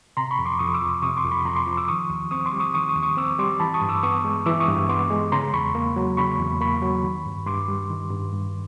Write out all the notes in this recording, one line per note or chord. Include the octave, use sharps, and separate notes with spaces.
C3 A#5 C6
B5 C#6
F2
C6 D6
F2 C#6 D#6
D6 E6
F3
C3 C#6 D#6
C6 D6
F2
B5 C#6
F2 A#5 C6
C6 D6
F3
D6 E6
D#3 C#6 D#6
D#2
C4 C#6 D#6
C6 D6
G3
C#6 D#6
D#3 C#6 D#6
C#6 D#6
D#2
C#6 D#6
C4 D6 E6
G3 C6 D6
E3 A5 B5
C#6 D#6
G2
D6 E6
B3 C#6 D#6
G#3
E3 D6 E6
C#6 D#6
G2
B3 C6 D6
G#3
C#3 A#5 C6
E2 B5 C#6
A#3
F#3
C#3 B5 C#6
E2
A#3 B5 C#6
F#3
D#3
G2
G2 C6 D6
G3
D#3
G2
G2